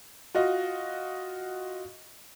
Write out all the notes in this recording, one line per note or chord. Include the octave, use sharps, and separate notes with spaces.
F4 F#4 D#5